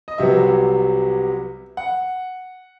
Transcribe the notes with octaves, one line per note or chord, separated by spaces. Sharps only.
D#5
C2 C3 F#3 B3 E5
F#5